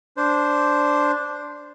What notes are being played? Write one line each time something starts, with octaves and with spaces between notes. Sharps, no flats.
D4 C5